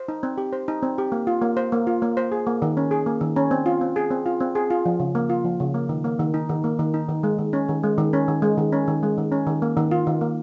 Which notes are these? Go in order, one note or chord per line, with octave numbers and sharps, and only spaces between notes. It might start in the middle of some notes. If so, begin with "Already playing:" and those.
Already playing: C5
D#4
C4
G4
C5
D#4
C4
G4
A#3
F4
A#3
C5
A#3
F4
A#3
C5
G#4
A#3
D#3
C#4
G#4
A#3
D#3
C#4
C4
F4
C4
G#4
C4
F4
C4
G#4
F4
F3
C#3
A#3
F4
F3
C#3
A#3
D#3
A#3
D#3
D#4
D#3
A#3
D#3
D#4
D#3
G#3
D#3
C#4
D#3
G#3
D#3
C#4
D#3
G#3
D#3
C#4
D#3
G#3
D#3
C#4
D#3
A#3
D#3
F4
D#3
A#3